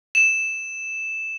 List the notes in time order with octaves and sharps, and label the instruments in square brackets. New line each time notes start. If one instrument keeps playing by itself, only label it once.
[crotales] E7